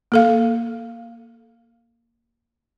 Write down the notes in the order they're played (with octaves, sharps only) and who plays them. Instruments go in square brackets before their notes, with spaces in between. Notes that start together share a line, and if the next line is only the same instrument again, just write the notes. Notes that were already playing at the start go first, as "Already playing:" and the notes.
[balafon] A#3 A4 F5